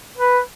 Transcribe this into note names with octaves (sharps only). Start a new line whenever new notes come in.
B4